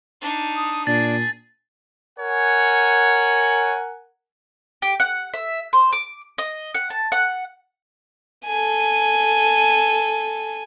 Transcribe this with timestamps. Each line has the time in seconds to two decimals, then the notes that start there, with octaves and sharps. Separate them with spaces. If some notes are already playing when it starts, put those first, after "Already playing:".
0.22 D4 D#4
0.56 D#6
0.87 A#2 D4 G#4 A6
2.19 A#4 C#5 F#5 G#5
4.82 G4
5.00 F#5
5.34 E5
5.73 C5
5.93 D6
6.38 D#5
6.75 F#5
6.90 A5
7.12 F#5
8.46 A4 G#5